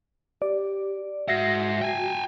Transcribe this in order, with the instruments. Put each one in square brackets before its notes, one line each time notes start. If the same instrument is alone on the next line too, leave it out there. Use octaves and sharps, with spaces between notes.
[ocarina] G4 [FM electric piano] D5
[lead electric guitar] G#2 F#5 [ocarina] F#4 [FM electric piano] E5 A#6 C7
[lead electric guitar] G5 G#5